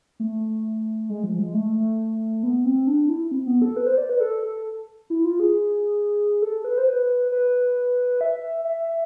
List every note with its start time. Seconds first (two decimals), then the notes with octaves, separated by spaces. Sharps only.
0.20 A3
1.10 G#3
1.24 F3
1.39 G#3
1.54 A3
2.43 B3
2.65 C4
2.87 D4
3.09 E4
3.31 C4
3.47 B3
3.62 A4
3.76 B4
3.87 C5
3.98 D5
4.09 B4
4.20 A4
4.42 A4
5.10 E4
5.25 F4
5.40 G#4
6.42 A4
6.64 B4
6.78 C5
6.89 B4
7.32 B4
8.21 E5
8.65 E5